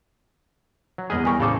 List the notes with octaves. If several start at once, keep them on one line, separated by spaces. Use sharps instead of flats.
F#3
E2 G#4 B4 D#5 F6
G3 A#4 G#5 C#6
A2 C#3 A4 C5 D6